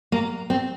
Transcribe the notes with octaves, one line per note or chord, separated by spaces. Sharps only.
A#3
C4